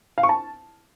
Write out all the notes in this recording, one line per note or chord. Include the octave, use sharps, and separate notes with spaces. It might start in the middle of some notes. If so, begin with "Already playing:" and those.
F5
C#6
A5